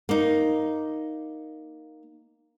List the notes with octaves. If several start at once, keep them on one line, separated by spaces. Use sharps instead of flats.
A#3 D#4